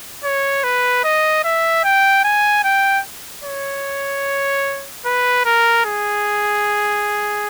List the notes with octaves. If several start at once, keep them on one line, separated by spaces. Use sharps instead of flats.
C#5
B4
D#5
E5
G5
G#5
G5
C#5
B4
A#4
G#4